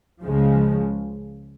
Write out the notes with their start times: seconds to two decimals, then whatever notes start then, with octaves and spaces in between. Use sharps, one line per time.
0.23 C#2 C#3 F3 G#3